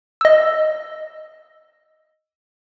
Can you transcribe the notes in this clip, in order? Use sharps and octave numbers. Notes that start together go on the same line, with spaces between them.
D#5 E6